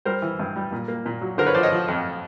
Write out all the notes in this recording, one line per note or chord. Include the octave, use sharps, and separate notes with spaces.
G3 A#4 C5
E3
G2
G3
A#2
A#3
A#2
F#3
D3 A#4 C5
B4 C#5
F3 C5 D5
C#5 D#5
F3
F2